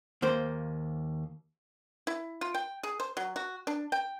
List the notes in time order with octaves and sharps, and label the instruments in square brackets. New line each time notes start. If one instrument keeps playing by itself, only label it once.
[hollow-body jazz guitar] D#2 A#3 C5
[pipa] E4
F4
G5
G#4
C5
F#3
F#4
D4
G5